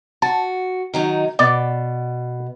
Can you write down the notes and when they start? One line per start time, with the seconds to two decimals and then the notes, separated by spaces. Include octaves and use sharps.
0.22 F#4 A5
0.94 D#3 F#3 D#4
1.39 B2 D5